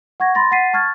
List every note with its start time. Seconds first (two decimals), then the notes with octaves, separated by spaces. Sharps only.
0.20 F#5 C#6 G#6 A#6
0.35 B5 C6 A6 A#6
0.51 F#5 A6 B6 C7 D#7
0.73 A5 C#6 F6 G#6 A6